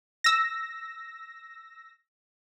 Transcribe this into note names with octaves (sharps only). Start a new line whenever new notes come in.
E6 A#6